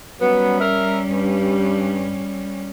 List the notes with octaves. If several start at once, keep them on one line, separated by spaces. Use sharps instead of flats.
F#3 G3 B3 C#4
A#4 E5
G2